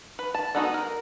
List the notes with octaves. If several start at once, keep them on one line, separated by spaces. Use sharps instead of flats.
B4
A5
G#3 B3 D#4 F#4 A4
A#4